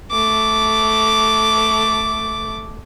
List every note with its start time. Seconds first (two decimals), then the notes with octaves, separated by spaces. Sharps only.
0.10 A3 D6